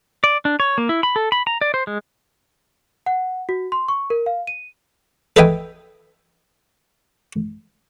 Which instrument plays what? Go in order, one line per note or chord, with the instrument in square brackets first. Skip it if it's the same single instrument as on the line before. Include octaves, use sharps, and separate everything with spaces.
[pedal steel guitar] D5
D4
C#5
A#3
E4
B5
A4
B5
A#5
D5
C5
G#3
[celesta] F#5
F#4
C6
C#6
A#4
F5
D#7
[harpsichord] A4 B4 D#5 E5 G5 G#5